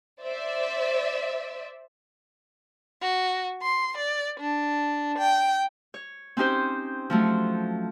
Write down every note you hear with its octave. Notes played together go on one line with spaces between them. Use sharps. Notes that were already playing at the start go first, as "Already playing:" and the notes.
C5 D5 E5
F#4
C6
D5
D4
G5
C#5
C4 C#4 D#4 G4 C5
F3 F#3 A3